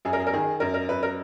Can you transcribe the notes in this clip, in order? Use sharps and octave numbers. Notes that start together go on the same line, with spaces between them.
F#2 G#4
A#4
G#4
A#4
D#3 G#4
F#2 A#4
A#4
F#2 B4
A#4